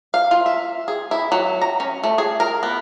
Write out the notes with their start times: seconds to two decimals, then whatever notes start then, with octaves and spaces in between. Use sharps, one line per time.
0.14 F5
0.31 F4
0.46 E5
0.88 G#4
1.11 E4
1.32 F#3
1.62 A#5
1.80 C#4
2.04 A3
2.18 G#4
2.40 A#4
2.63 B3